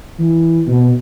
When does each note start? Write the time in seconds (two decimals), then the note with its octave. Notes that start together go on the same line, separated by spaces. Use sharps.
0.19 E3
0.67 B2